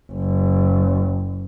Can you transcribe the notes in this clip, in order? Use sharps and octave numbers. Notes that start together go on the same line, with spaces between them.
F#1